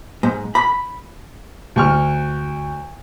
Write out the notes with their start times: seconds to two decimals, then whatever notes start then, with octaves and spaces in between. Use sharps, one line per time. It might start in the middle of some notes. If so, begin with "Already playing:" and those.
0.23 G#2
0.55 B5
1.76 D2 C#6 F6